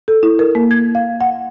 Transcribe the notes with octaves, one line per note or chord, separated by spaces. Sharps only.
A4
E4
A#4
A#3
G#6
F5
F#5